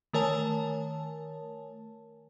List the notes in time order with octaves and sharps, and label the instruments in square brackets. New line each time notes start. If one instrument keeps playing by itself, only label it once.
[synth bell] D#3 A3 A#4 C#5 G#5 A5